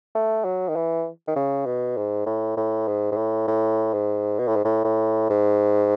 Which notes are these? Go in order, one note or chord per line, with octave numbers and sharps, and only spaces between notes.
A3
F#3
D#3
E3
D#3
C#3
B2
G#2
A2
A2
G#2
G#2
A2
A2
G#2
B2
A2
G#2
A2
A2
G#2